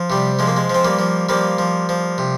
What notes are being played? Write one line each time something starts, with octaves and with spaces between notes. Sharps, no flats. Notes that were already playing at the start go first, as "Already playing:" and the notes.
Already playing: F3
C3 G3
F3 G#3
A#3
G#3
F3 C4
G3 A#3
F3
F3 G3 A#3
F3
F3
C3